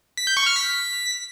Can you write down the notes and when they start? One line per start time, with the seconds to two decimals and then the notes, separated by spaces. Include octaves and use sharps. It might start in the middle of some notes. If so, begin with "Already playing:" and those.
0.17 B6
0.27 G6
0.37 C#6
0.46 F6
0.56 B6